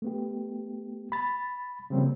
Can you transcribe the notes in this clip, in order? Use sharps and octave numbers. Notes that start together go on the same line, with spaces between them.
A3 B3 G4
B5 A6
C#3 F3 G3 A#3 C4